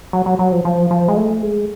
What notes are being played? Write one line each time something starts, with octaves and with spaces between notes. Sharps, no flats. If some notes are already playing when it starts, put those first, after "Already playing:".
F#3
F#3
F#3
F3
F3
F3
G#3
A3
G#3